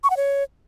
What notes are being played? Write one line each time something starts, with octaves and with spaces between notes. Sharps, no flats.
C#6
F#5
C#5